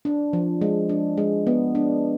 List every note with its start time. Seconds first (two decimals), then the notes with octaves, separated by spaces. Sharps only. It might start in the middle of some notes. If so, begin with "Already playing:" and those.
0.05 D4
0.33 F3
0.61 G#3
0.89 D4
1.17 G#3
1.47 B3
1.75 D4